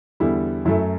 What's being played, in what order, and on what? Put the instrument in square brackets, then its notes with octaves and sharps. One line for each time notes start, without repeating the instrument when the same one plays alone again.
[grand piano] E2 D3 G3 E4
F#2 F#3 A3 E4